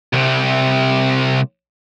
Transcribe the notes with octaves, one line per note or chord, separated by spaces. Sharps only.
C2 C3